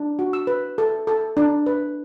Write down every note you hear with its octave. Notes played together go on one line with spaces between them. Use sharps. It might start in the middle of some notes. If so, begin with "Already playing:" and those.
Already playing: D4
F#4
E6
B4
A4
A4
D4
B4